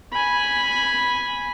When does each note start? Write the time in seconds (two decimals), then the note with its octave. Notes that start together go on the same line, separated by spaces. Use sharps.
0.12 G#5 B5